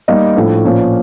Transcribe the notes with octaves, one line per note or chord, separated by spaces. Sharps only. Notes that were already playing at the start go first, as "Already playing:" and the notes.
G3 A#3 D#4
A2 F3 A3 D4
A#2 F3 A#3 C#4 F4